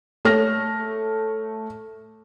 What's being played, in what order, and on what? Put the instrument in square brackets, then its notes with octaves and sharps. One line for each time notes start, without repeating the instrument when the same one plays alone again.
[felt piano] A3 C#5 F6 A#6